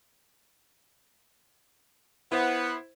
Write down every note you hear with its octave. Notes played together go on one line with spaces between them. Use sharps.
B3 E4 C5